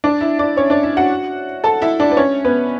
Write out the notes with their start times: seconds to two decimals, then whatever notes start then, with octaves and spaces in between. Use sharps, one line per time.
0.04 D4 D5
0.21 E4 E5
0.39 D4 D5
0.57 C#4 C#5
0.70 D4 D5
0.83 E4 E5
0.97 F#4 F#5
1.64 A4 A5
1.82 E4 E5
2.00 D4 D5
2.11 B4
2.17 C#4 C#5
2.45 B3 B4